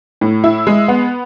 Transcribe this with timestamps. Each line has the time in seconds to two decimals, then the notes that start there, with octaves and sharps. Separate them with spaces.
0.21 A2
0.44 E4
0.67 G#3
0.88 B3